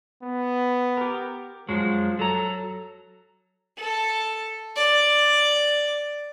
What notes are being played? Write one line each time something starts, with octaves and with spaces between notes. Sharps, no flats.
B3
G4 A#4
F#2 F3 F#3 G#3
F#3 A4 A#5
A4
D5